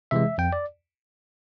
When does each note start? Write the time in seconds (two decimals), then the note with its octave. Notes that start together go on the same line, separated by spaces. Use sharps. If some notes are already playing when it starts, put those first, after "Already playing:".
0.11 C3 E3 G#3 E5
0.38 F2 G5
0.53 D5